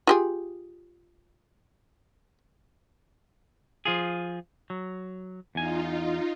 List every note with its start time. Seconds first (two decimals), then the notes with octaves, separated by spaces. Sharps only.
0.07 F4 G4 G#4
3.85 F3 F4 G#4
4.70 F#3
5.55 E2 D#4 F4 G#5